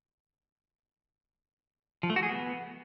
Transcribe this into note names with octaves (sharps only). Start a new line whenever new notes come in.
F3
A3
F#4
G#4
B3